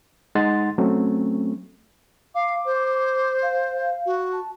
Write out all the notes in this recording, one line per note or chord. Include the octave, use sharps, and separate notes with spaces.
G#3 D#4 F#5 C6 A6
F#3 A3 C4 C#4
F5 D6
C5
F5
F#4
A5